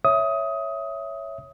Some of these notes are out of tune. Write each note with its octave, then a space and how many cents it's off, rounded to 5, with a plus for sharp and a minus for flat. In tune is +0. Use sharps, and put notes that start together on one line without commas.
C#5 +0 E5 +0 D#6 +15